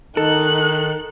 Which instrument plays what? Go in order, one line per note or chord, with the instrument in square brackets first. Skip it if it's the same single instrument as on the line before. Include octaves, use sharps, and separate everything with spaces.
[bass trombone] D#3 [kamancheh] D#4 F#6 [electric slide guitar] A4